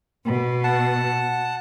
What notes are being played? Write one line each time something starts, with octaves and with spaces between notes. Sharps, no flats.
B2
F#5 A5